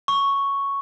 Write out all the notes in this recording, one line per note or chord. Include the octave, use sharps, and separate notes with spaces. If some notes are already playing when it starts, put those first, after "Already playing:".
C#6